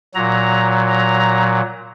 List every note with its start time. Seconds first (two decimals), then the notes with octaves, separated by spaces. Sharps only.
0.14 A#2 F#3 A#5
0.89 A#5